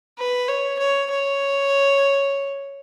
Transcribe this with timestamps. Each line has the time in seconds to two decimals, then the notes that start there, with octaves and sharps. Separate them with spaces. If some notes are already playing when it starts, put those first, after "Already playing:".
0.18 B4
0.48 C#5
0.79 C#5
1.10 C#5